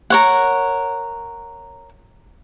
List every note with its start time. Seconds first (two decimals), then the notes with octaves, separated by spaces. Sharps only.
0.10 A#4 C#5 F#5